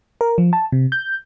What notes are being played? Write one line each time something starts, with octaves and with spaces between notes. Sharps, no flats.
A#4
F3
A5
C3
G6